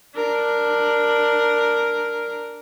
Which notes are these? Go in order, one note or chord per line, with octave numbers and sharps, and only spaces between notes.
D4 A#4